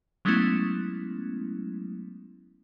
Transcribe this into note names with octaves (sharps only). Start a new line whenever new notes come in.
F#3 G#3 A3 B3 C#4 E4